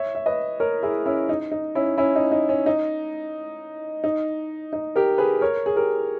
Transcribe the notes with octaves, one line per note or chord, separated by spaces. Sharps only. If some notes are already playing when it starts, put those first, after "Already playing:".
Already playing: C#5 E5
E5
B4 D#5
A#4 C#5
E4 G#4
C#4 E4
D#4
D#4
C#4 E4
C#4 E4
D#4
D#4
C#4
D#4
D#4
D#4
G4 A#4
G#4 B4
A#4 C#5
G#4
G4 A#4